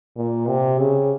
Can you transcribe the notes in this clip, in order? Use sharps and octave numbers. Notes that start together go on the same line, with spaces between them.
A#2
C3
C#3